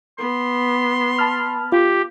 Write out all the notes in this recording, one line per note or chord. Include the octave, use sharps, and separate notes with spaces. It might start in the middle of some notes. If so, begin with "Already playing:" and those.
B3 C6
A5 B5 F6
F4 G4